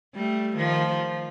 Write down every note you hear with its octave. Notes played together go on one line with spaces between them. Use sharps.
G3 A3
D#3 F3